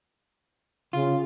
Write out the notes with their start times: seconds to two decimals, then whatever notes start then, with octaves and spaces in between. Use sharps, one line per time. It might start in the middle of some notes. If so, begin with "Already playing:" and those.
0.93 C#3 F4